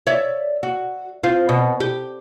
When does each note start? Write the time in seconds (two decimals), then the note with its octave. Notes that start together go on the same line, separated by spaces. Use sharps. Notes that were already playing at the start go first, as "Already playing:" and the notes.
0.07 C#5 D5 E5
0.63 F#4
1.23 C4 F4
1.49 B2
1.80 G4